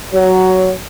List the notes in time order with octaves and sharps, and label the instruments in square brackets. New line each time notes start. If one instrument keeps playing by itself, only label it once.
[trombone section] F#3